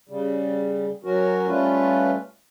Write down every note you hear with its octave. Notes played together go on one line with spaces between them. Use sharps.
C#3 G3
F#3 C#4 F#4 A#4
G3 A3 C#4 F4 B4